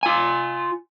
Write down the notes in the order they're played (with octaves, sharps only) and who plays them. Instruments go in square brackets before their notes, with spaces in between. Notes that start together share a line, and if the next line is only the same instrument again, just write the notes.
[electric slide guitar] F4 G#5